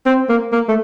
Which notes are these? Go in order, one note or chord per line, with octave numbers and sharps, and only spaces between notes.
C4
A#3
A#3
A3